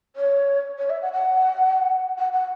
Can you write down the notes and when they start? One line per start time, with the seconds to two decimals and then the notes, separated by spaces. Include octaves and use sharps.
0.16 C#5
0.78 C#5
0.90 E5
1.02 F#5
1.13 F#5
2.19 F#5
2.33 F#5